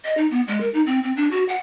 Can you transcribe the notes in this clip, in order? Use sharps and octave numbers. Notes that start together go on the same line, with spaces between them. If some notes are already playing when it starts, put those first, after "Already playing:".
D#5
D#4
B3
G#3
A#4
D#4
C4
C4
D4
F#4
F#5